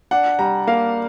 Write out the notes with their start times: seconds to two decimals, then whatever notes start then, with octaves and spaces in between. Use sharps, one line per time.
0.11 D4 F#5
0.39 G3 A#5
0.67 A#3 F5